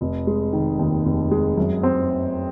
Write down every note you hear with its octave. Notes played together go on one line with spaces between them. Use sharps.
F1
G#3
D#3
D#2
F1
G#3
F#2
C4